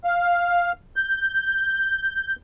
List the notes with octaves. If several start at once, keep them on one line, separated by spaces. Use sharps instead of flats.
F5
G6